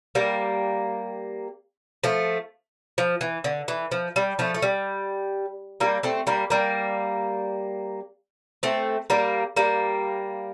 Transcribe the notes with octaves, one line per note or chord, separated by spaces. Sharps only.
G3 A#3
F3 A3
F3
E3
D3
E3
F3
G3
F3 A3
A3
G3
G3 A#3
A3 C4
G3 A#3
G3 A#3
A3 C4
G3 A#3
G3 A#3